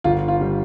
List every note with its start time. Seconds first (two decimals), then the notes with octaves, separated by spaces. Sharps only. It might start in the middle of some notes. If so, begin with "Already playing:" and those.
0.04 G1 F4
0.28 F4
0.41 G3